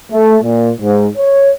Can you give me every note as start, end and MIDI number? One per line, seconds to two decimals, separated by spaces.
0.11 0.36 57
0.42 0.70 46
0.80 1.07 44
1.17 1.50 73